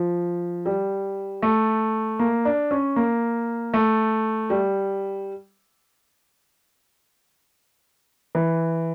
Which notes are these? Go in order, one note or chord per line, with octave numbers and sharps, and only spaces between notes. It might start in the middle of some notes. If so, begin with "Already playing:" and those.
Already playing: F3
G3
A3
A#3
D4
C#4
A#3
A3
G3
E3